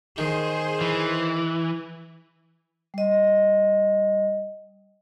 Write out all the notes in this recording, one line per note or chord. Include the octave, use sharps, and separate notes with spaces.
D#3 G#4 C5
E3
G3 D#5